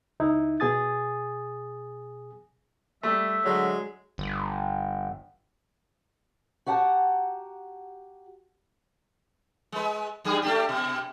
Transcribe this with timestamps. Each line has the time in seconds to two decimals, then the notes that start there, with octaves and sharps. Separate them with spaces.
0.20 C#2 D#4 E4
0.60 B2 G#4 G#5 D#6 A6
3.03 G3 A3 E5
3.45 D3 F#3 G#3
4.18 G1
6.66 F#4 G4 F#5 A5 A#5
9.72 G#3 B4
10.25 G2 G3 G#4
10.42 A3 D4 G4
10.69 B2